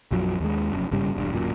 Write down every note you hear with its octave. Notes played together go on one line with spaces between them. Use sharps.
B1 F#2 F3 F#3
D#2 G#3
F1 F#2
G#1 G2 C#3 G3
E1 G2
D1 F#2 A#2